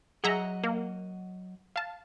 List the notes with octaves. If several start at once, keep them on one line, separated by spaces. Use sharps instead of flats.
F#3 G#4 D#5 E5 F#5 A#5
A#3
F5 A5